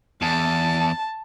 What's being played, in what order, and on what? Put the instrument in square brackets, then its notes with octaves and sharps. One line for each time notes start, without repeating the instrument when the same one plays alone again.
[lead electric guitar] E2 [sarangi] A5